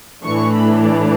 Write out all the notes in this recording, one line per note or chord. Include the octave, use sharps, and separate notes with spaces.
A2 E3 A3 D4 C#6
B5
D5